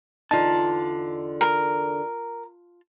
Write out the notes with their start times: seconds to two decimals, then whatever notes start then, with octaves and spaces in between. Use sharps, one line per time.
0.31 E2 D3 D#4 F4 A5
1.41 A#4